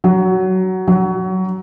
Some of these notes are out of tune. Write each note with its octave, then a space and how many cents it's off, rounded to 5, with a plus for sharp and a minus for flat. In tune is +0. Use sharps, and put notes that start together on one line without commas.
F#3 +15
F#3 +20